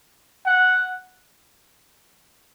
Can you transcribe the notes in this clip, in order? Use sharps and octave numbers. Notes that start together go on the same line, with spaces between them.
F#5